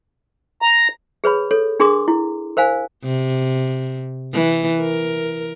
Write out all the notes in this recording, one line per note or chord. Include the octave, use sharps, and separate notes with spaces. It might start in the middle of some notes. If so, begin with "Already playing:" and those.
A#5
G#4 B4 C#5 B5
A4 C#5
D4 G#4 A#4 C6 D6
E4
A#4 C5 F5 G#5
C3
E3
A#4